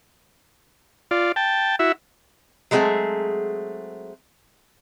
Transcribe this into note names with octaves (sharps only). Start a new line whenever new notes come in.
F4 D5
G5 A5
E4 F#4 E5
F#3 G#3 A3 C4 G#4